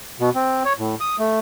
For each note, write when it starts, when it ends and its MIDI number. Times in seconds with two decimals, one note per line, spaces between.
0.20 0.30 47
0.35 0.63 60
0.65 0.73 73
0.78 0.95 45
1.00 1.16 87
1.19 1.39 57